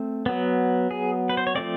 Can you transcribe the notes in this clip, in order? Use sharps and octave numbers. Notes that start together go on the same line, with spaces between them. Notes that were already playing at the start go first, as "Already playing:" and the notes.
Already playing: A3 C4
F#3 B3
G#4
B4
C5
C#5
F3 A3 C4 D5